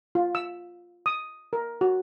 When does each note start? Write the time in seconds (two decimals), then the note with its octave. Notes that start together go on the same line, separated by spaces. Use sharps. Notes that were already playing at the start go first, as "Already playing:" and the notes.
0.15 F4
0.35 E6
1.06 D#6
1.53 A#4
1.81 F#4